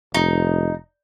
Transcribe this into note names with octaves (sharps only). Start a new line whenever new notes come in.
F1 D#4